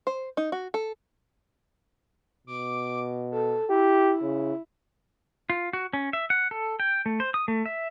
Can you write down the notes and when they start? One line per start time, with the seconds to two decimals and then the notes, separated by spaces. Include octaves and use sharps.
0.07 C5
0.37 D#4
0.52 F#4
0.74 A4
2.47 B2 D6
3.31 A4
3.70 E4 G4
4.23 C#3
5.50 F4
5.73 F#4
5.93 C#4
6.13 E5
6.30 F#5
6.51 A4
6.80 G5
7.06 A3
7.20 C5
7.34 D#6
7.48 A3
7.66 E5